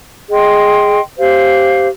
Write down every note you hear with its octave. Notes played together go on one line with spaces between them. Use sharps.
G#4 D#5 G5 C6
G4 C5 F5